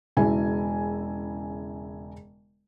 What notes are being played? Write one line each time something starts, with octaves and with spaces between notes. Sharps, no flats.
E1 C#3 E4 G#5